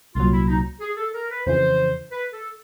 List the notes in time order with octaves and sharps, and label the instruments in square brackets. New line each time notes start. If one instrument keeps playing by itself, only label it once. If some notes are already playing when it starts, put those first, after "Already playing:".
[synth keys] C2 A#2 F#3 [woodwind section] F4
[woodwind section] E4
D#4
G#4
A4
A#4
B4
[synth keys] F2 C#3 E3 [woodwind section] C5
[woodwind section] B4
A4